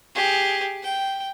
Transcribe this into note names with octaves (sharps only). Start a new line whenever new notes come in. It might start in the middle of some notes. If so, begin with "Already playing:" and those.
G4 G#4
G5